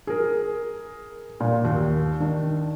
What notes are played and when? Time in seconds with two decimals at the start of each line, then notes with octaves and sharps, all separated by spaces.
0.07 G#4 A#4
1.40 A#2
1.65 D#2
2.20 D#3 D4